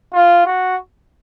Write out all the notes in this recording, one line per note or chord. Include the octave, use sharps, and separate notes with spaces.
F4
F#4